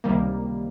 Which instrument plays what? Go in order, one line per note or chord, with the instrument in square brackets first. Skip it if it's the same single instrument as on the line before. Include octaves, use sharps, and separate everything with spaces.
[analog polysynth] C#2 C3 D#3 G3 A#3